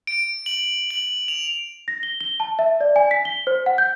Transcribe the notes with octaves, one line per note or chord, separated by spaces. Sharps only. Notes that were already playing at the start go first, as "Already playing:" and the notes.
D7
F#7
F#7
F7
A#6
G7
G7
A5
E5
D5
G#5
B6
G7
C5
F#5
G6